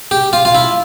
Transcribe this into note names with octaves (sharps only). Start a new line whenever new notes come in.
G4
F4
F4
E4